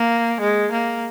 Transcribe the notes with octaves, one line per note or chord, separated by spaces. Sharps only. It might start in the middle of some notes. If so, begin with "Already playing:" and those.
Already playing: A#3
G#3
A#3